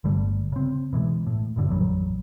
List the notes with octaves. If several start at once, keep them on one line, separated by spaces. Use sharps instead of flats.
G1 D3 G3 A3
C#3 C4
B2 E3 G#3
A2
F1 F#2 A2 D3
A1 F2 F#3 G3